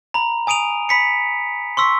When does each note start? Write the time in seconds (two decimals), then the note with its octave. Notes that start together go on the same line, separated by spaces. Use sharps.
0.14 A#5 B5
0.47 G#5 D#6 D7 D#7 F7
0.89 B5 B6 C#7
1.77 C6 C#6 E6 B6